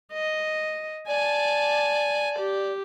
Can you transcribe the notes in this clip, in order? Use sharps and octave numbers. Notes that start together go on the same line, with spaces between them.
D#5
D5 G#5 A5
G4